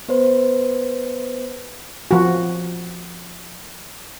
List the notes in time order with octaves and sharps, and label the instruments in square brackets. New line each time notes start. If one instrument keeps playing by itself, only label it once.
[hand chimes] B3 B4 C5
[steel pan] F3 F#4